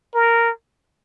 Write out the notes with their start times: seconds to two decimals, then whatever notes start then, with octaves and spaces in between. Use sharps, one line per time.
0.14 A#4